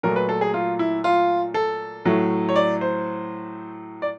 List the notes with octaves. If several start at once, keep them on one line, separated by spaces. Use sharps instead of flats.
A#2 F#3 A3 A#4
B4
A4
G#4
F4
E4
F4
A4
A2 F#3 A3
C#5
D5
C5
D5